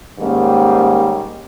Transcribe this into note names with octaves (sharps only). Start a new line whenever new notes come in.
G#2 D#3 G3 A#3 C#4